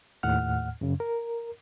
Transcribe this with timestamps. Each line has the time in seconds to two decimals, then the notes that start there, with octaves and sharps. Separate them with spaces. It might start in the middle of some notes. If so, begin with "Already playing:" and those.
0.23 D#2 A2 F#5 F6
0.81 F#2 C#3
1.00 A#4